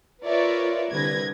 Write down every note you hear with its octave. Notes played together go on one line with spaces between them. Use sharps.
F4 A#4 B4 C#5 D5 E5
C2 D3 B4 G#6 A#6